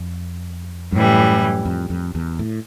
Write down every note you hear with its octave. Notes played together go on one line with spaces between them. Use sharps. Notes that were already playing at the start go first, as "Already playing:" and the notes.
Already playing: F2
F#2 A2 E3 G3
F2
F2
E2
A2